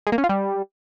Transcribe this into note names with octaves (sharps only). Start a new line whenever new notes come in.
G#3
A#3
C#4
F4
G3